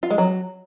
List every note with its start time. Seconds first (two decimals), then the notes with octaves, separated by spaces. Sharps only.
0.03 F4
0.11 G#3
0.18 F#3